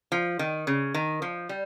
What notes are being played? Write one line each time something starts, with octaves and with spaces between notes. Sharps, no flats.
F3
D#3
C#3
D#3
F3
G3